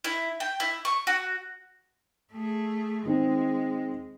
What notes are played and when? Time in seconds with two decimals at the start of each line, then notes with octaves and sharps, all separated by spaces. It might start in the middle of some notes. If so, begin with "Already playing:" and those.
0.04 E4
0.40 G5
0.60 E4
0.85 C#6
1.07 F#4
2.33 A3 G#4
3.05 D#3 G#3 C4